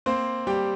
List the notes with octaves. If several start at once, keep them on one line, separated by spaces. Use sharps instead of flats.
A#3 C4 C5
G3 G4 G5